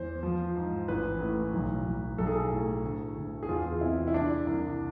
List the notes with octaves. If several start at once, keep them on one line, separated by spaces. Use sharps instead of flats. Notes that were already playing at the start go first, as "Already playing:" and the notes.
Already playing: E2 C5
F3
G#2
A1 B4
A2
B1
B1
B1 A4
G#4
A4
A2
D2
D2
G#4
E2 F4
C3 E4
E4
E3 D4
C2